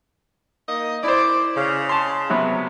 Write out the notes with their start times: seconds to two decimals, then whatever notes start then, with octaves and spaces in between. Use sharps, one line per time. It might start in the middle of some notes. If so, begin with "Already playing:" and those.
0.69 A#3 D#4 D#5
1.04 E4 C5 D5
1.57 C#3
1.89 A5 C6
2.30 C3 F#3 B3